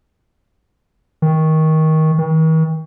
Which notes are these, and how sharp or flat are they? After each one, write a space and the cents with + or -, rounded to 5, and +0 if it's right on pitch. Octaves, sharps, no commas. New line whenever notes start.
D#3 +20
D#3 +45